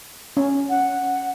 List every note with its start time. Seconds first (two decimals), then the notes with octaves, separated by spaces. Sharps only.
0.37 C#4
0.70 F#5